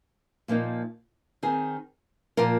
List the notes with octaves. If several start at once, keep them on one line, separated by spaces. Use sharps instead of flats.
A#2 F3 A#3 D#4
D#3 C4 G#4
A#2 F3 A#3 F4 A#4